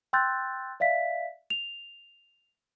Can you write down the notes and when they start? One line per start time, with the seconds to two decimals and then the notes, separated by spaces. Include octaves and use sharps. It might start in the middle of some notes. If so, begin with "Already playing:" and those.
0.13 G5 C6 E6 F#6 G6 A6
0.80 D5 E5 F5 B6
1.50 F7